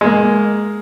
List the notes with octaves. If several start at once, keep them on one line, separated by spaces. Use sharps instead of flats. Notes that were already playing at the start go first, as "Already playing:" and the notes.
G#3 A#3